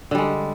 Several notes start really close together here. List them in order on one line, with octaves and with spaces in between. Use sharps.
D3 G3 G#3